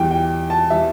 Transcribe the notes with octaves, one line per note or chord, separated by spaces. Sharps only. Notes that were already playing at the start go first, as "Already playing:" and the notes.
Already playing: E2 E3 G3 G5
G5
A5
E3 G3 E5